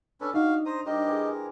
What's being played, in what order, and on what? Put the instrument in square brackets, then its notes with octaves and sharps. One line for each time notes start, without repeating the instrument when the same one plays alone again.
[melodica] C#4 A4 B4 [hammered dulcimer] D4
[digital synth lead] D#4 [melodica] F#4 F5
[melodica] C5 A#5 D#6
[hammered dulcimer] G3 D4 C5 [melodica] G4 A#4 D#5
[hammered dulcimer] E3 G#4
[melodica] A#4